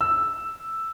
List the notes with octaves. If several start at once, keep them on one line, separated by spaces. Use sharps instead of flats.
E6